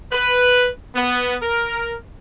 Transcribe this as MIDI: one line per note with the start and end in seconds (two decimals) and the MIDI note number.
0.12 0.68 71
0.95 1.36 59
1.42 1.95 70